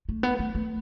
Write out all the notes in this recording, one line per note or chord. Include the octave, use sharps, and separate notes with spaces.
A3
B3
A3
A3